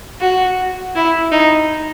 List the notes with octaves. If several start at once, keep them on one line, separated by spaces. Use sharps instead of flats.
F#4
E4
D#4